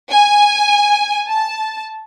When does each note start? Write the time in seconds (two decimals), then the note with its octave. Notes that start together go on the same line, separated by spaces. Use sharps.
0.11 G#5
1.28 A5